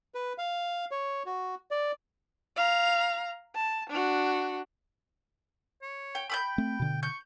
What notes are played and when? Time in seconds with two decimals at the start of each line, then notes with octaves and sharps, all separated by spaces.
0.15 B4
0.38 F5
0.91 C#5
1.26 F#4
1.71 D5
2.56 F5 A#5
3.55 A5
3.90 D4 F#4
5.83 C#5
6.15 G5
6.30 G5 B5 D6 G6
6.58 A3 C4
6.80 B2 D3
7.03 C#6 G6